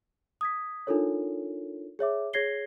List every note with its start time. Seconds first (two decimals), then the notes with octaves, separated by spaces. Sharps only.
0.41 D#6 G#6 B6
0.87 D4 D#4 F4 A4 A#4 C#5
1.99 G#4 C#5 E5 D6
2.33 G#4 C#5 G#6 A#6 C7 G7